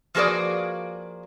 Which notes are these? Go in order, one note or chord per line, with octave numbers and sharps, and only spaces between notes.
F3 A#3 F#4 G#4 B4 D5